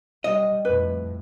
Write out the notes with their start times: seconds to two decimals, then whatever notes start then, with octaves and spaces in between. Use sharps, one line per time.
0.24 G3 D#5
0.65 F2 A2 B4